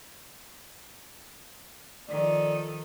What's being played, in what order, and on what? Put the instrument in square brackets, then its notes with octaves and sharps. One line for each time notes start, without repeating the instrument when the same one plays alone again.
[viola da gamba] D#3 F3 A4 [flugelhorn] D5